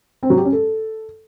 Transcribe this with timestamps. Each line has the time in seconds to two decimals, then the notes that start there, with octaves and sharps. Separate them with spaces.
0.23 C4
0.30 F#3
0.38 G4
0.45 C#4
0.52 A4